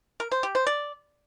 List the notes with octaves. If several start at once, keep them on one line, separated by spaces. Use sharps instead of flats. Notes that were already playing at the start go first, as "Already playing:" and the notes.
A#4
C5
G4
C5
D5